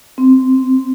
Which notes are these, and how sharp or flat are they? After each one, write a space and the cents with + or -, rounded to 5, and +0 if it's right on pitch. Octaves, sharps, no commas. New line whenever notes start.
C4 -10